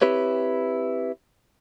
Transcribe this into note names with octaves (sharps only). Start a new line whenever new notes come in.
C4 E4 G4 B4 C#5